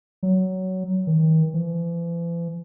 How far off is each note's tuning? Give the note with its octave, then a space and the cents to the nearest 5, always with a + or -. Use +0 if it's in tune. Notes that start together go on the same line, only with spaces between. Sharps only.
F#3 +15
D#3 +40
E3 +45